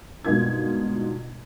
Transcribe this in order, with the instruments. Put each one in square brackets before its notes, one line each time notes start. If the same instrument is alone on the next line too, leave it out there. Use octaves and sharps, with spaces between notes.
[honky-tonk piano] G1 G#2 B2 A#3 F4 G#6